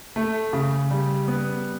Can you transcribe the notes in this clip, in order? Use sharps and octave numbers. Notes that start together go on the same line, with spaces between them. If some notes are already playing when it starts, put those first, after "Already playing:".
A3
C#3
G3
B3